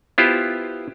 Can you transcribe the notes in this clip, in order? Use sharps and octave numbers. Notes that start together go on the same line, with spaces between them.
B3 E4 F4 G4 B4 C5